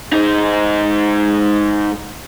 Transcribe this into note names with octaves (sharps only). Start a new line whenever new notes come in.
G#2 D#4